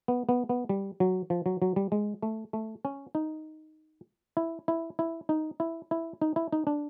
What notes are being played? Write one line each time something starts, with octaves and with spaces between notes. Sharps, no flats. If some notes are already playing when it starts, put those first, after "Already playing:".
B3
B3
B3
G3
F#3
F3
F#3
F#3
G3
G#3
A3
A3
C#4
D#4
E4
E4
E4
D#4
E4
E4
D#4
E4
D#4
D4